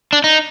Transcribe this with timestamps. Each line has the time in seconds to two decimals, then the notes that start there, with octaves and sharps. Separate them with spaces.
0.13 D4
0.24 D#4